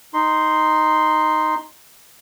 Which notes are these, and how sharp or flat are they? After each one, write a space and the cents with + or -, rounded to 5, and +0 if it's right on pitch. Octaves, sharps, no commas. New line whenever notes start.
D#4 +0 C6 +0